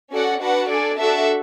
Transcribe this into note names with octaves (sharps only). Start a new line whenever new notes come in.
C#4 F#4 A4 D5 F#5
D4 F#4 B4 F#5 A5
D4 A4 D5 G#5
D4 F#4 A4 E5 A5